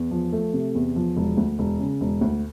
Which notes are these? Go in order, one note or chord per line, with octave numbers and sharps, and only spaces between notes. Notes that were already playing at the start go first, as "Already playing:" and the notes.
Already playing: E2
F3
A3
C3
E2
F3
E1
D2
E1
C#3
E1
D2